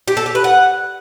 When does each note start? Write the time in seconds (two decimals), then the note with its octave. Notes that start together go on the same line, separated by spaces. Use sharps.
0.08 G4
0.17 A4
0.26 G4
0.35 B4
0.44 F#5